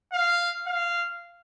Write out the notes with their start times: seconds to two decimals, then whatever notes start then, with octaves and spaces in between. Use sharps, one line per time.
0.13 F5
0.67 F5